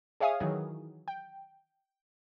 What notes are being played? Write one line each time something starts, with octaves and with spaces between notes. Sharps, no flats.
G#4 C#5 E5 F5 G#5 D#6
D#3 E3 F#3 G#4
G5